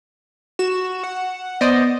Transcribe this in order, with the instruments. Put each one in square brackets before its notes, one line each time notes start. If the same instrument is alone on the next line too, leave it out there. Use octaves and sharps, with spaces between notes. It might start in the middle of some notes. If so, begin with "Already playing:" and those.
[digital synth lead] F#4 [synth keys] E7
[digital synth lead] F#5
[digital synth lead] B3 [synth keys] C5 D5 D#5